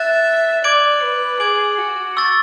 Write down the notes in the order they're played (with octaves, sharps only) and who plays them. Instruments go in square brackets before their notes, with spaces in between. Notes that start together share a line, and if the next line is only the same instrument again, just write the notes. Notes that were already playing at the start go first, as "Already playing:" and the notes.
Already playing: [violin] E5 [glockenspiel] F#6 A6 E7
[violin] D5 [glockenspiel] D6 G#6 D7 F#7
[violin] B4
[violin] G#4 [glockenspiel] D6 G#6 D7 F#7
[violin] F#4
[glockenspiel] C#6 E6 A6